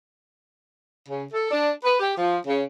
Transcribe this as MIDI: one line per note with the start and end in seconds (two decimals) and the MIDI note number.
1.08 1.24 49
1.32 1.49 69
1.51 1.71 62
1.83 1.95 71
2.00 2.13 67
2.18 2.38 53
2.47 2.62 49